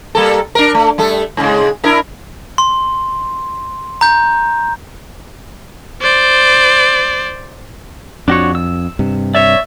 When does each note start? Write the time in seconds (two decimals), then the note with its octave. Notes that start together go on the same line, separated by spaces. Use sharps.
0.15 G3 A#3 A4
0.55 D4 A#4
0.74 A3
0.98 G3 A3 A4
1.37 G#2 C#3 G#3
1.84 D4 E4 A#4
2.58 C6
4.01 A#5 G6
6.02 C5 D5
8.28 F2 D4 F#4 C#5
8.55 E6
8.99 G2 C3
9.35 C#5 D5 E5